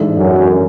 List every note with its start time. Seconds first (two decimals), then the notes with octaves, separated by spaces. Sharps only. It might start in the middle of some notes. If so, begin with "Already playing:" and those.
Already playing: A1 G#2 G#3 D4 A4
0.17 F#2